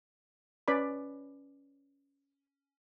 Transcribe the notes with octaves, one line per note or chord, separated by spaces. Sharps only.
C#4 B4 D5 B5